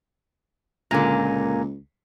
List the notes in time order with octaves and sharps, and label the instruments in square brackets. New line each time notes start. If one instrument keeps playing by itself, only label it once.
[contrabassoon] C#2 [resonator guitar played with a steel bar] A#2 D3 [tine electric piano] A#3 G#5 A#5